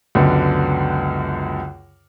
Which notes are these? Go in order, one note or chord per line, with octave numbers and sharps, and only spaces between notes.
C#2 F#2 D3 B3